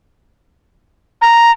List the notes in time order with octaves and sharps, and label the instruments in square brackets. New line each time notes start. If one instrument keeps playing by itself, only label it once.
[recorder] A#5